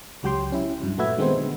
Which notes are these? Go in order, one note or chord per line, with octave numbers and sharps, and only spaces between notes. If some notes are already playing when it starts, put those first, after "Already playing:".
C#2 F#3 G4 G5 C6
C#4 E4
G2 F#3
A#2 A3 F#4 B4 E5 G#6
D#3 G#3 B3 C4 D#4 C5
D3